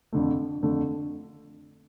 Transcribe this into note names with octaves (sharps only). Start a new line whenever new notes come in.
F2 D3 A3
F2 D3 A3